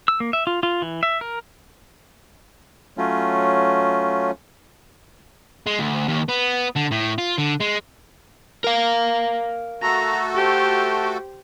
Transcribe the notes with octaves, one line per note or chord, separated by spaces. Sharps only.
E6
A#3
E5
F4
F4
E3
E5
A#4
F#3 A3 C#4 F4
G#3
D2
D#2
B3
D3
A2
F4
D3
G#3
A#4 F5
A3 F#4 A4 A#5
G4 C5